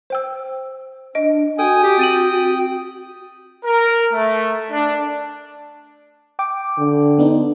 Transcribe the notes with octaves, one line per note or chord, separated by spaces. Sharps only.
C5 G5 E6
D4 D#5 D7
F#4 A4 G5 G#5 D#6
G4
C4 A6 D#7 F#7
A#4
A3
D4
G5 D6
D3
B3 D4 D#4